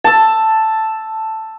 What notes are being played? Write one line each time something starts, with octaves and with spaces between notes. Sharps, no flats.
A5 E6